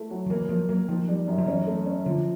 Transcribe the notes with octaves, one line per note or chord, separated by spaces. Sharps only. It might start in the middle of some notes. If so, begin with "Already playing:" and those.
Already playing: A3 E4
F#3
F3
E3 A#3
F3 A#3
F#3 A#3
D#3 F3
G3
F#2
F3
E3 C#4
A3
C#4
D3 F3